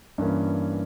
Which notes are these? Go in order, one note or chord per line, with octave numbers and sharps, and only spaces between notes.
G2 E3 A#3 C#4